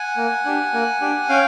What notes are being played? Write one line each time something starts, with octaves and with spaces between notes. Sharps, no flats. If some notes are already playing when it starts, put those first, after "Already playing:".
Already playing: F#5 G#5
A#3
D4 G4
A#3
D4 G4
C#4 F5 G5